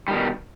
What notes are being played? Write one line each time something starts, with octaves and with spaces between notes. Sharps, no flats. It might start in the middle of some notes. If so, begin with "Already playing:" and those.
B2 D#3 G3